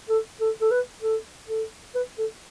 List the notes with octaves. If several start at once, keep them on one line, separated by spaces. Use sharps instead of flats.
A4
A4
A4
B4
A4
A4
B4
A4